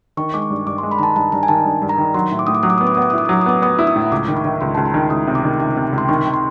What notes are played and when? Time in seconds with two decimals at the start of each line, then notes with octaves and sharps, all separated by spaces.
0.17 D#3 C#6
0.34 G#3 D6
0.42 C#6
0.50 G2
0.67 G2 D6
0.78 G#3 C6
0.91 B5
0.98 D#3 A5 A#5
1.16 G2 A5
1.32 G2 A#5
1.43 G#5
1.48 D#3 A5
1.65 G2
1.82 G2
1.89 A#5
1.98 D#3
2.14 F#3 C6
2.31 A2
2.39 D6
2.47 A2 D#6
2.55 D6
2.63 F#3 D#6
2.70 D6
2.78 D#6
2.81 B3
2.87 D6
2.95 B3 D#6
3.02 D6
3.10 D#6
3.13 E4 D6
3.25 D#6
3.29 F#3 D6
3.41 D#6
3.46 B3 D6
3.62 B3 D#6
3.79 E4
3.87 D#6
3.96 A2
4.12 C#2 D6
4.28 D#3
4.37 C#6
4.45 D#3
4.61 C#2 C6
4.75 C#2 A5
4.86 A#5
4.94 D#3
5.10 C#2 D#6
5.27 C3
5.35 D6
5.43 D#3
5.60 C#2 D6
5.77 C3
5.93 C#2
5.98 C6
6.09 D#3 C#6
6.25 D#3
6.34 C6